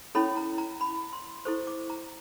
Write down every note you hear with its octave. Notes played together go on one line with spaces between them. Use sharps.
C#4 E4 A4 C#5 B5
A#5
A#5
B5
C6
E4 A4 C5 C#6
D6
A#5